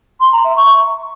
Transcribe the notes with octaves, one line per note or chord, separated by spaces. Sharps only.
C6
A#5
E5
C#6